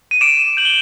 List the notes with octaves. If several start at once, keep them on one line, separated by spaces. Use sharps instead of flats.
D#7
D6 D7 E7
G6 F#7
G7